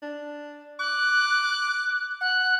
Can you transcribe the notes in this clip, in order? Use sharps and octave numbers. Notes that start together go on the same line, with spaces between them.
D4
D6 F#6
F#5 F#6